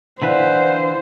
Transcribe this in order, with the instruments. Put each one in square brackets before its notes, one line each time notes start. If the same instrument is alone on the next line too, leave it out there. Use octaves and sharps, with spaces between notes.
[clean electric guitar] D3 E3 B4 [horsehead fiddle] C5 [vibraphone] D5 F5 F#5